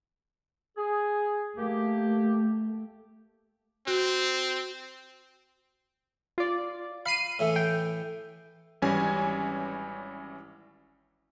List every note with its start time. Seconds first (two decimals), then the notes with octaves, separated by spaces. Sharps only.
0.78 G#4
1.58 A3 A#3 G4
3.87 C4 F#4
6.38 F4 D5
7.06 F5 B5 C7 D#7
7.39 A2 E3 A3
7.56 G5
8.82 G#1 E3 G3 C#4 G#5